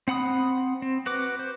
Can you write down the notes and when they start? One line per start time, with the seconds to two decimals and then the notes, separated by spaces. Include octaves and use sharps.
0.08 C4 F#5 B5 D#6
0.82 C4
1.06 F#4 B4 D6
1.39 C5